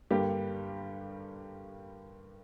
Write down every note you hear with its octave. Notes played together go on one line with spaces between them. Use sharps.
G2 D3 G3 A#3 G4